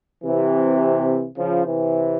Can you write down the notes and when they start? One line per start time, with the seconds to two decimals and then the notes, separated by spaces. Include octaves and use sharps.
0.23 C3 E3
1.38 C#3 F3
1.66 C3 E3